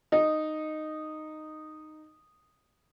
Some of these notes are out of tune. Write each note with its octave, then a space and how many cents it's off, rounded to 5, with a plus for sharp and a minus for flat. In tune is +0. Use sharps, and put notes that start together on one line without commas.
D#4 -10